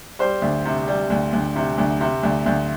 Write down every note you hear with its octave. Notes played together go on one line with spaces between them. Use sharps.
G3 C5
D2
C3
G3
D2
D2
C3
D2
C3
D2
D2